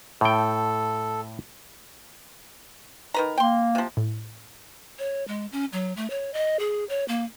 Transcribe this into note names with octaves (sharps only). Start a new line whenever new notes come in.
A2 A4 G5
D#3 B4 A#5
A#3 G5 C6
C3 F3
A2
C#5
G#3
C#4
F#3
A3
C#5
D#5
G#4
C#5
A#3